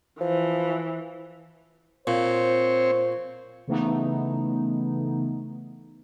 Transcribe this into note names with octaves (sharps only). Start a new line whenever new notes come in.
E3 F3
A#2 C4 C5 C#5
C#3 E3 A3 B3 D#4